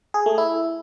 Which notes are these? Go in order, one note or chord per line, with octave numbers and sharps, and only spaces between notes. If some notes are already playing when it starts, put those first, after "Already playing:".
G#4
A3
E4